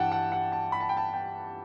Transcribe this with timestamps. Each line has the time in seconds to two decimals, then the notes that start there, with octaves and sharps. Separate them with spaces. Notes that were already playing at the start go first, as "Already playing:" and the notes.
Already playing: G2 E3 F#5 G5 A5
0.12 F#5
0.32 F#5
0.52 A5
0.72 B5
0.80 A5
0.89 G5
0.97 A5
1.13 G5